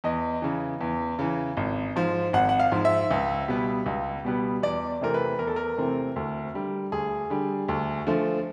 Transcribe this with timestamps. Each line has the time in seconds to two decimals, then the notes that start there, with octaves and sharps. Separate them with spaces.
0.04 E2 D#5
0.42 C#3 E3
0.81 E2
1.19 C#3 E3
1.57 G#1
1.96 G#2 F3
2.33 G#1 F#5
2.49 F#5
2.59 F5
2.72 G#2 F3
2.85 E5
3.11 C#2
3.48 B2 G3 B3
3.86 C#2
4.25 B2 G3 B3
4.63 E2 D5
5.01 C3 E3 A3 C4 A#4
5.14 B4
5.39 E2 A#4
5.47 A4
5.56 A#4
5.77 C3 E3 A3 C4
6.16 D2
6.54 D3 G3
6.92 D2 G#4
7.30 D3 G3
7.68 D2
8.07 D3 F3 A3